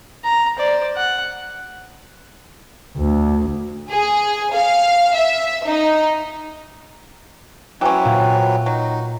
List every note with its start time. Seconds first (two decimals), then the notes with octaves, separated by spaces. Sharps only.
0.24 A#5
0.57 C5 D5
0.96 F#5
2.97 D2
3.90 G#4
4.53 F5
5.16 E5
5.66 D#4
7.81 E3 F#3 C4 C#4 B4 E5 G5 D6
8.05 A#2
8.66 F#3 D#4